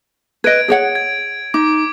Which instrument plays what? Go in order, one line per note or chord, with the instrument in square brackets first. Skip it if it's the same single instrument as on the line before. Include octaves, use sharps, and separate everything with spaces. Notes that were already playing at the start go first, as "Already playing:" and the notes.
[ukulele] B4 D#5 [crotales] G#6 D7
[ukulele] G#4 C#5 F#5
[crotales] G#6
[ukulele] D#4 [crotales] D6